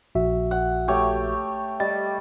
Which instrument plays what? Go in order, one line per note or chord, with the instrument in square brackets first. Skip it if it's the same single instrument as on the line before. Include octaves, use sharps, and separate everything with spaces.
[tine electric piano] A#1 F#4 E5
[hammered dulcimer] F#5
A3 G4 C#5
[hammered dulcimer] G3 [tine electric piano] D#5 A6